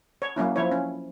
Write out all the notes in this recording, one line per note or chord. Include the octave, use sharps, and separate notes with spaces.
C#5
F#3 A#3 C#4 E4
F3 E4 C#5
C#4